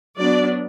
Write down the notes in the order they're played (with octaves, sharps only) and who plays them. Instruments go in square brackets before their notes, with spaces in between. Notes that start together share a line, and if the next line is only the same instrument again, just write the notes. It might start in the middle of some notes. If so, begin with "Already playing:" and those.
[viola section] F#3 B3 D4 D5